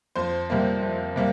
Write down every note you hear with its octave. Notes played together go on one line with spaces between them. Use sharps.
F2 C5
C3 G3 A#3
F2
C3 G3 A#3